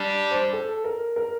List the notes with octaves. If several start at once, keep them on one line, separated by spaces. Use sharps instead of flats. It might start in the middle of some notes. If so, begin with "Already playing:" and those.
Already playing: G3 D4 G4
C5
A4
A#4
A#4